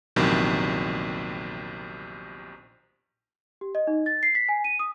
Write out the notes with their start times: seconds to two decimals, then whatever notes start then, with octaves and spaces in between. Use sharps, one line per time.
0.16 A#1 E2 C3 D#3 F#3
3.61 G4
3.75 D#5
3.87 D#4
4.06 A6
4.23 C7
4.35 B6
4.49 G#5
4.64 D#7
4.79 D#6